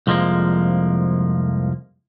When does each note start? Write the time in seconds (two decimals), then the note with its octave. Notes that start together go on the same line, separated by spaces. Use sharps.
0.07 C2 F2 F3 G#3 A#3